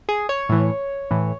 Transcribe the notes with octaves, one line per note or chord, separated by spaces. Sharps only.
G#4
C#5
A2 E3
A2 E3